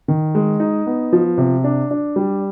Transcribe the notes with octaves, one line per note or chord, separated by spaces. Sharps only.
D#3
G#3
D#4
B3
F3
C3
D4
D4
G3